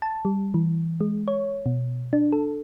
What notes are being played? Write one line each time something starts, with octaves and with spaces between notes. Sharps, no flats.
A5
G3
E3
G#3
C#5
B2
D4
A4